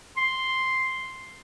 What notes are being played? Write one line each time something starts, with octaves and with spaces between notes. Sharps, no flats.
C6